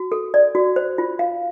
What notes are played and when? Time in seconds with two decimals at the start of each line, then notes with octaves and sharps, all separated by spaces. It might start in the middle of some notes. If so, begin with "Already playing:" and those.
Already playing: F#4
0.12 A4
0.34 D5
0.55 F#4
0.76 C5
0.98 F4
1.19 F5